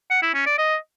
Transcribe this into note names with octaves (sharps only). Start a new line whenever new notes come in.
F#5
E4
C#4
D5
D#5